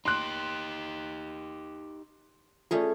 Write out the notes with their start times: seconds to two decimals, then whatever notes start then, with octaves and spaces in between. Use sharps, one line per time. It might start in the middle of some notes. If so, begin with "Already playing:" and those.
0.05 D#4 G4 C6 F#6
2.71 A3 C#4 F4 G#4 C#5 D5